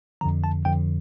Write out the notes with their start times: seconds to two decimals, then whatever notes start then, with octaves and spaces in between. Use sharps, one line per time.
0.21 F2 D3 F3 A#5
0.44 A5
0.65 F2 D3 F3 G5